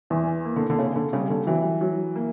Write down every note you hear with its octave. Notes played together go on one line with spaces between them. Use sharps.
E2 E3
A#3
D3
D3
C#3 C#4
D3
C#3 G3
D3
E3 F#3
F#3
A#3